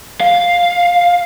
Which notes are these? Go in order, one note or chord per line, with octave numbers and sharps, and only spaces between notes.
F5